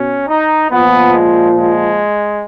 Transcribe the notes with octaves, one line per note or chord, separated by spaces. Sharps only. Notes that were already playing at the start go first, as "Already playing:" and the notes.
Already playing: B2 C#4
D#4
A#2 F3 B3
G#3
G#3